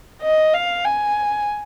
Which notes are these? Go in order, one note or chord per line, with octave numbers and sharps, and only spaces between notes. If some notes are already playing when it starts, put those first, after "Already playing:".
D#5
F5
G#5